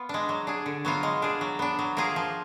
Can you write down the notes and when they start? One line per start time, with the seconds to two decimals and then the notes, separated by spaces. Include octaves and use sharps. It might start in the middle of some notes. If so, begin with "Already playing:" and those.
Already playing: B3 F4
0.09 G#3 D4
0.29 F#3
0.47 D4 G#4
0.66 D3
0.85 F#3 B3 F4
1.03 G#3
1.22 D4 G#4
1.41 F#3
1.59 B3 D4
1.79 F#3
1.97 A#3 F4 G#4
2.16 F3